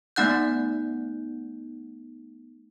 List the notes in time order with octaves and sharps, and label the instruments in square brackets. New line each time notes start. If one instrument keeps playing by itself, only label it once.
[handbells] A3 B3 D#4 F#5 F#6 G6